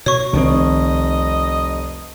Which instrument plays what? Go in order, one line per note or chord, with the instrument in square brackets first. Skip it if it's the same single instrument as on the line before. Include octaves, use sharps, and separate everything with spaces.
[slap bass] B2 [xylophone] C#5 C#6
[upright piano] F1 [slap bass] C2 D#3 C4 [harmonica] D#5